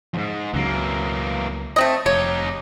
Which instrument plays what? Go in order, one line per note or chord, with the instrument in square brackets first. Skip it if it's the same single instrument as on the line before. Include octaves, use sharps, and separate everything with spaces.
[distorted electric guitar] F2 G#2
[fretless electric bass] C#2 C#3 F#3 [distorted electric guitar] E3 A#3
[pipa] A3 C4 D#5
[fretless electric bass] F1 [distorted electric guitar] D#4 G4 [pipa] C#5